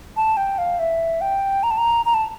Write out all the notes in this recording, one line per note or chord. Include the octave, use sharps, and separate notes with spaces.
A5
G5
F5
E5
G5
A#5
A5
A#5
A#5
A5